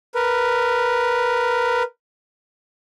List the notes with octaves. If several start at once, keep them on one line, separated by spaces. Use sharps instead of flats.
A#4 B4